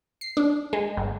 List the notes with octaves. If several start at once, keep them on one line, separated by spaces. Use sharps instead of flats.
C7
D4
G#3
G1